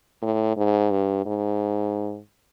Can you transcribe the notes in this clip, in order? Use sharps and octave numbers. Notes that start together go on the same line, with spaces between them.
A2
G#2
G2
G#2